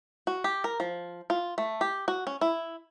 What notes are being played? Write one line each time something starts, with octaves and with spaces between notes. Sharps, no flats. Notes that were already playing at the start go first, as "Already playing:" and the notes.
F#4
G4
A#4
F3
F4
A3
G4
F#4
C#4
E4